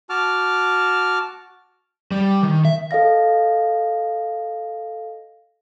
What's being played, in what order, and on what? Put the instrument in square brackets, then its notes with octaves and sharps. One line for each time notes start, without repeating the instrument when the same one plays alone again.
[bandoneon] F#4 A5 D6 F6
[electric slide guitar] G3
D#3
E5
[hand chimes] A4 D#5 F5 A#6